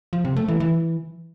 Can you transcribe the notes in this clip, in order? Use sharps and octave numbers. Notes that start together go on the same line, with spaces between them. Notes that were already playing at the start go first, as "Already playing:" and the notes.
F3
C3
A3
E3
E3